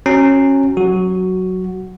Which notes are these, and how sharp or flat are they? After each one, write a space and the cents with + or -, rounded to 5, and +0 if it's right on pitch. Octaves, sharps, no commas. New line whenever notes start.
C#4 -20 F#4 +10 A#5 -25
F#3 +0 F#4 +5